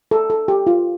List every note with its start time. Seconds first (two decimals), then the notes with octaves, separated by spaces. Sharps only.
0.11 A4
0.30 A4
0.48 G4
0.67 F4